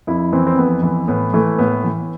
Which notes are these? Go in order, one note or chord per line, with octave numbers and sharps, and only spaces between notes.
F2 E4
E3 C4
C4
F2 B3
E3
A2 B3
E3 A3
A2 B3
E3